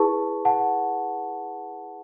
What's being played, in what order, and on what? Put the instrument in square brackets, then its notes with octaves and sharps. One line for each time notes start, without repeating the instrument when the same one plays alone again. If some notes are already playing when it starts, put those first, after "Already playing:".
Already playing: [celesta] E4 G#4 B4 A5 C#6
F#5 A5